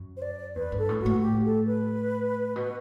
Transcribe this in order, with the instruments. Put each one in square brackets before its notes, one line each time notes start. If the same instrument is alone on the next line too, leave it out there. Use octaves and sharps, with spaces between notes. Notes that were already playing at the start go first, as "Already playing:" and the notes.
Already playing: [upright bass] F#2
[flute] C5
D5
[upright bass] E2 [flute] B4
[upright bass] G2
[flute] A4
[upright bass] A2
[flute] F#4
[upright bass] A2
[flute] G4
A4
B4
[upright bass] B2